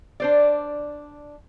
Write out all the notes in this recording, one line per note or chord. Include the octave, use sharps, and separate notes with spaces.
D4 C5 D5